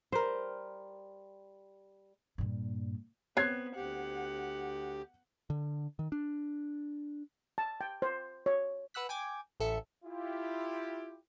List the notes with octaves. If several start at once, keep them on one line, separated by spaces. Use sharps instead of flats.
G3 A#4 C5
G2 A#2
B3 C4 C#5 F#6 G#6 C7
D2 G4 F#5
D3
D#3
D4
A5
G5
C5
C#5
B4 F#5 E6 F#6 B6
G5 G#5 D6 G#6
A1 A4 E5 C#7
E4 F4 G4